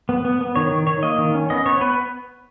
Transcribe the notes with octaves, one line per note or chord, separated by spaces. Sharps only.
B3
B3
B3
D#3 C#5
D#3
D#3 C#5
A#3 D#5
D#3
C#4
B3 D#5
B3 C#5
B3 B4